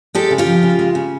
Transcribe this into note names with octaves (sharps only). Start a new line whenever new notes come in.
G#3 G4 A4
C#3
F4 G4
F3
C#3
G#3
C#3